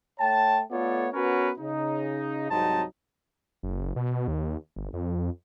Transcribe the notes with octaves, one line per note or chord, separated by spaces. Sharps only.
A3 C#5 G5 A5
A3 B3 F4 A4 C#5 D5
B3 C#4 F#4 A#4 B4 C#5
C#3 D#4
C2 G#2 F#3 C4 D#4 A5
F#1
B2
D#2
G1
F2